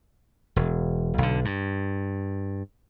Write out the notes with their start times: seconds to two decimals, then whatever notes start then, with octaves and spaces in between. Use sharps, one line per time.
0.56 E1
1.18 B1 D3
1.45 G2